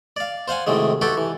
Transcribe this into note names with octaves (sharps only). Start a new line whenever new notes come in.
D5 F5
C5 F5 F#5 G#5
A2 C3 D#3 F#3 G#3
F#4 G4 A4 B4 C#5 G5
E3